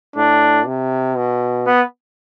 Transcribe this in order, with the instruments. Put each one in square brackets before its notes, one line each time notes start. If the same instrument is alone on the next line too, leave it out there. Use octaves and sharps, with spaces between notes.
[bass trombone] A2 [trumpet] D4
[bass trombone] C3
B2
[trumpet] B3